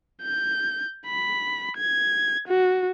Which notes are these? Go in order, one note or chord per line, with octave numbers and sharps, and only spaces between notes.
G6
B5
G#6
F#4